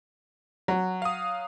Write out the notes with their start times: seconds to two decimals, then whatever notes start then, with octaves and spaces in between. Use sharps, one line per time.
0.68 F#3
1.02 F5 D#6